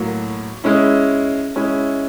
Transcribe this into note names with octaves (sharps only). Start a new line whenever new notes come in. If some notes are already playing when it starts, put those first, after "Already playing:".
Already playing: A2 F#3 A#3
G#3 C#4 E4
G#3 C#4 E4